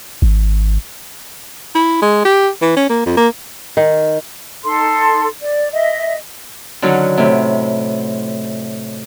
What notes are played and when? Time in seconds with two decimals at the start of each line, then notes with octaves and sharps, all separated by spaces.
0.22 G#1
1.75 E4
2.02 G#3
2.25 G4
2.62 E3
2.77 C#4
2.90 A#3
3.06 F2
3.17 A#3
3.77 D#3
4.64 D#4 A4 C6
5.42 D5
5.73 D#5 E5
6.82 D3 D#3 F#3 C#4
7.18 A2 C3